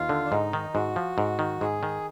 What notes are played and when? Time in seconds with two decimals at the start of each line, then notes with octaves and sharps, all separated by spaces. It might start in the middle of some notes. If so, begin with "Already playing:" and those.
Already playing: D#2 F4
0.09 D3
0.25 D4
0.31 G#2 D#4
0.53 D#3
0.74 G#2 F#4
0.96 F3
1.18 G#2
1.39 D#3
1.61 G#2 G#4
1.83 D#3